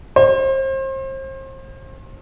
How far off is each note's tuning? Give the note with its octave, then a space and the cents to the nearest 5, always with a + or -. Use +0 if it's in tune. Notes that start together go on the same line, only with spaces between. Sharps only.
C5 +35